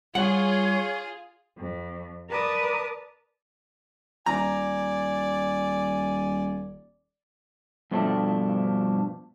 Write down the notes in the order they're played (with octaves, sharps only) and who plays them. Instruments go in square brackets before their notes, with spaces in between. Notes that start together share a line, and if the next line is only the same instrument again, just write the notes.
[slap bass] G3 [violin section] F4 G#4 [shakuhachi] C#5 [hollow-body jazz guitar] F#5
[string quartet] F2
A#4 B4 D5 A5 D#6
[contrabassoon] D#1 [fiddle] D5 [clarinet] G#5 [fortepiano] A#5
[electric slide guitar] G2 B2 F3 A3 C4 D4